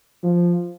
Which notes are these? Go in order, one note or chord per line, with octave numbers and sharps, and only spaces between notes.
F3